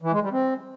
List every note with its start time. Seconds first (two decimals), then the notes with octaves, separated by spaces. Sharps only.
0.02 E3
0.12 G#3
0.22 G3
0.32 C4